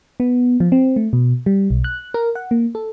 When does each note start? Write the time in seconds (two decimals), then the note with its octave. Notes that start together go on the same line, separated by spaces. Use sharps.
0.20 B3
0.60 F3
0.72 C4
0.96 A3
1.13 B2
1.46 G3
1.71 B1
1.84 F#6
2.14 A#4
2.35 F#5
2.51 A#3
2.75 A4